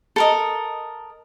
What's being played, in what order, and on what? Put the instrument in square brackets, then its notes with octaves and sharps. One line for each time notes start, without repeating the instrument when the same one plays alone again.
[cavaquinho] A4 A#4 D#5